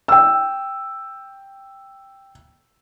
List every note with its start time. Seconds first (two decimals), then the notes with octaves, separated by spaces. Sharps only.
0.08 G5 E6